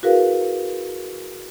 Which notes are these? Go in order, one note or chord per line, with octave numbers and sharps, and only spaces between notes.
E4 F#4 G#4 A#4 B4 F5